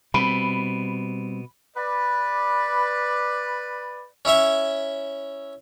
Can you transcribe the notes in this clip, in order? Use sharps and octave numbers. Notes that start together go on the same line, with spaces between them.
B2 G3 C4 B5
B4 D5
C#4 E4 C#5 E5